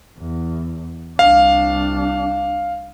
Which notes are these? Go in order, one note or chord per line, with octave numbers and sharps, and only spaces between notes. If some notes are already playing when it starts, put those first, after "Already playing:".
E2
C2 D4 F5